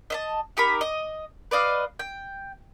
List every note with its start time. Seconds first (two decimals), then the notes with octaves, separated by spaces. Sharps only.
0.10 D#5 E5 A5
0.57 D#4 G4 A#4 B5
0.81 D#5
1.51 B4 D5 D#5 F5
1.99 G5